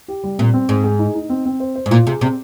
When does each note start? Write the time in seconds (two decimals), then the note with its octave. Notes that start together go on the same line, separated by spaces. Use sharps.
0.08 G4
0.24 G3
0.38 A#2 C4
0.54 C4
0.69 G#2 G#4
0.84 G#4
0.99 D#4
1.15 D#4
1.29 C4
1.46 C4
1.60 C5
1.76 C5
1.86 G#2
1.91 A#2 F4
2.07 C3 G#4
2.21 C3 C4